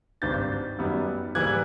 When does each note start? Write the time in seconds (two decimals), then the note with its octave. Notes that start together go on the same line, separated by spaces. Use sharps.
0.22 G#1 G2 D#3 G6 A6
0.79 F#2 D#3 G3 B3
1.35 G#2 E3 G3 A#3 F#6 G#6